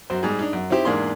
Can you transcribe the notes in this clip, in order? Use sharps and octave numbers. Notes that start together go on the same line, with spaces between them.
F#2 F#4 C5
G#2 G3 D#4 G#4
D4 D#4
F#2
C4 D#4 E4 G4 C5
E2 G#2 A#3 D4 G#4 C6